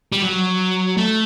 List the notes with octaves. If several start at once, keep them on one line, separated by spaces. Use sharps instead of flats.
G3
F#3
A3